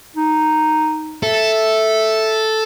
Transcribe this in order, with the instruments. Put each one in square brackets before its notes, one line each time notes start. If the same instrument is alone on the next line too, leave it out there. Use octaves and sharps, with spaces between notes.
[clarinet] D#4
[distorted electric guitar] A4 [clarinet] E5